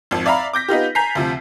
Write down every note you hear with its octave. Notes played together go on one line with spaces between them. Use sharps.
G#1 F2
D5 E5 F5 A#5 B5
D6 G6 A#6 B6
B3 D#4 F4 G4
G#5 A#5 G6 B6 C7
D2 C3 F3